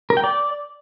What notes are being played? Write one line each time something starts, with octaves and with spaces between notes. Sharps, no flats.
A#4
G5
D5